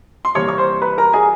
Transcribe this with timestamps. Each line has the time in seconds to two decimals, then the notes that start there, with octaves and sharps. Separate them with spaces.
0.25 C6
0.35 C3 E3 G3 A#3 C#5 C#6
0.48 C#6
0.58 C5 C6
0.82 B4 B5
0.98 A#4 A#5
1.13 G#4 G#5